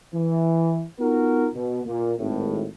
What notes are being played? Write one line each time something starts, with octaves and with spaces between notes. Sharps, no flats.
E3
B3 D#4 F4 F#4 A#4
B2
A#2
G#1 A2